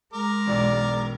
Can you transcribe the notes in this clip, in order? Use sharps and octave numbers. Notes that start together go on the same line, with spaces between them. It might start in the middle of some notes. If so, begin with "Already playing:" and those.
G#3 A#4 D6
E1 B1 D5